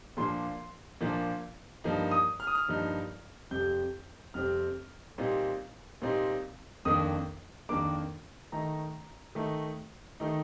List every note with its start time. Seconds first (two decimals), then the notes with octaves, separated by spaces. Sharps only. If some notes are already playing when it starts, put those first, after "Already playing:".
0.17 A#2 F3 A#3 D4 C6
1.01 A#2 F3 A#3 D4
1.84 G2 F3 A#3 D#4
2.11 D#6
2.40 F6
2.47 D#6
2.55 F6
2.68 G2 F3 A#3 D#4
3.51 F2 C3 G3 C4 G6
4.34 F2 C3 G3 C4 F6
5.18 A#2 G3 C4 D#4
6.02 A#2 G3 C4 D#4
6.85 F2 D#3 A#3 D4 D#6
7.69 F2 D#3 A#3 D4 D6
8.52 D#3 A3 D#4 A#5
9.35 D#3 A3 D#4
10.20 D#3 A3 D#4